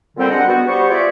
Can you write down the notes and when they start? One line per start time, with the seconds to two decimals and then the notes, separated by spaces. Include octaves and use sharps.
0.17 A#2 D3 G3 C4
0.30 G3 G#3 D4 D#5 F#5
0.47 B3 F#4
0.67 G3 B3 G4 C5 C#6
0.89 F4 G#4 D5 E5